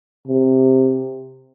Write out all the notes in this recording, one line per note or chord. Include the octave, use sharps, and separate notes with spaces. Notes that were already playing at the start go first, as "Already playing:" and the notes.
C3